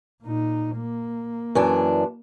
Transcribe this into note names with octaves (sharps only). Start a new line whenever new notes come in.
A#2 D#4
A#3
F#2 E3 D4